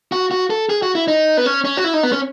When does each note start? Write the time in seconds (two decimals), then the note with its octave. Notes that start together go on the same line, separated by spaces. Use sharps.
0.12 F#4
0.31 F#4
0.50 A4
0.70 G#4
0.82 F#4
0.95 E4
1.08 D#4
1.37 B3
1.46 C#4
1.65 C#4
1.77 F#4
1.84 E4
1.94 D#4
2.03 B3
2.12 C#4